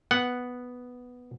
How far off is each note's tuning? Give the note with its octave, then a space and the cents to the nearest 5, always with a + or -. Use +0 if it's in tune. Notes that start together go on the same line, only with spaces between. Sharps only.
B3 +0 F#5 +0